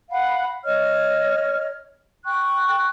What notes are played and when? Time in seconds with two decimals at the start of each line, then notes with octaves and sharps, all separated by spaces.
0.10 F5 F#5 B5
0.65 C#5 D#5 F6
2.26 G5 C#6 F#6